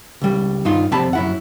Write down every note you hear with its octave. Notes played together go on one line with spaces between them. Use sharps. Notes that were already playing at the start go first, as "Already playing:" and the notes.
C#2 G3
G2 D#4 F4 C6
F2 C3 D5 A5 B5
F#2 E4 F#5